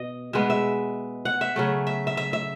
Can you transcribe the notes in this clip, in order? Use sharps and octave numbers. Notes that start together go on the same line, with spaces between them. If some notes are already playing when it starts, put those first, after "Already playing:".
Already playing: B2 D#5
B2 G#3 B3 E5
E5
F#5
E5
C#3 F#3 A3
E5
E5
E5
E5